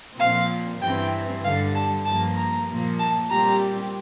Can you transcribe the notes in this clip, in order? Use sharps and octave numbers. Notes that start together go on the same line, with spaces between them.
A#2 F3 C4 F5
G2 E3 G3 C4 G5
G2 D3 G3 F5
A5
G2 F3 A#3 A5
A#5
A#2 F3 A#3
A5
A#2 G3 C4 G4 A#5